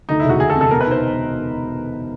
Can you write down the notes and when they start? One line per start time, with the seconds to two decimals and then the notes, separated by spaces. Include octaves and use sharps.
0.09 D2 D#4
0.20 E4
0.25 E1 F#4
0.40 E1 G#4
0.50 A4
0.55 C3
0.61 A4
0.71 B2 A#4
0.81 B4
0.86 D#4 C5